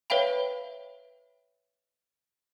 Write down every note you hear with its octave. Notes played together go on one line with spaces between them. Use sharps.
B4 C#5 E5 F5 G5 B5